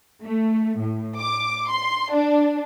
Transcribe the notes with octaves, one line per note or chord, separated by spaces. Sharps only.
A3
A2
D6
C6
D4